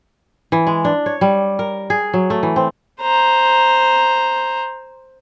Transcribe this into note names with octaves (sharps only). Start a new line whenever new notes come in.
E3
G#3
D4
C#5
G3
A#4
G#4
F#3
A3
E3
C4
C5 A#5